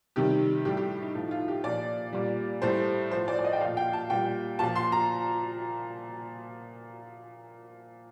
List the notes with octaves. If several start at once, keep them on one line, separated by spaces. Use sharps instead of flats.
C3 D#3 G3 G4
A2 G3 G4
G4
D#4
A2 F3 D#4
F4
G4
A#2 F3 D5
A#2 G3
A2 G3 C5
A2 F3 C5
D5
D5
D#5
G5
A#2 F3 F5
G5
A5
A#2 G3 G5
A#2 F3 A5
C6
A#5